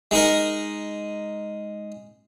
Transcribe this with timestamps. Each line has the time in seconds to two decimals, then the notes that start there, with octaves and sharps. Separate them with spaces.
0.11 G#3 D#4 A#4